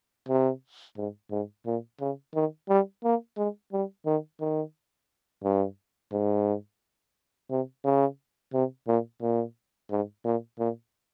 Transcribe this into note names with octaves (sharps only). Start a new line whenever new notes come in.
C3
G#2
G#2
A#2
C#3
D#3
G3
A#3
G#3
G3
D#3
D#3
G2
G#2
C3
C#3
C3
A#2
A#2
G#2
A#2
A#2